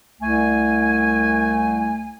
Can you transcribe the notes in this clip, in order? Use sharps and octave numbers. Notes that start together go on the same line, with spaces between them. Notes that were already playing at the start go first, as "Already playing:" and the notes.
C2 A3 G#5